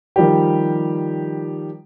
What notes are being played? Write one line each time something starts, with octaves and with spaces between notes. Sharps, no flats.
D#3 F3 G3 G4